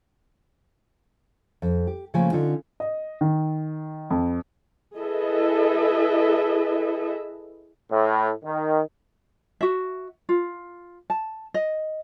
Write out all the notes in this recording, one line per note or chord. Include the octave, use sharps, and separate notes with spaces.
F2
G4
C#3 F3 A3 A#3 G#5
D3 C#4 D#4 F4
D#5
D#3
F2
E4 G#4 A4 B4 D#5 E5
A2
D#3
F#4 E5
F4
A5
D#5